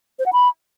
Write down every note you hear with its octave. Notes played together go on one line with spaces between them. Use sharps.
C5
F#5
B5